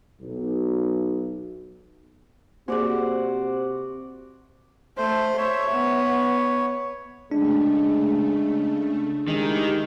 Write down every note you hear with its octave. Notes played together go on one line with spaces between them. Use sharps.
B1
C3 A#3 F#4 G#4 C5 D5 F#5
A3 C5
C#5 E5
B3
C#3 G#3 A3 D4
D#3 G#3 E4 G4